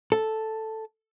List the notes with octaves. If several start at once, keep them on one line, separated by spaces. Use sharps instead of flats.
A4